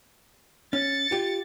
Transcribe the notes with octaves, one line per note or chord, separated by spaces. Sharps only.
C#4 A6 C#7
F4 G4